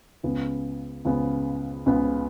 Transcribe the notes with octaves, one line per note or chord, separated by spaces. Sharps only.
C#2 C#3 B3
C#2 C#3 B3
C#2 C#3 B3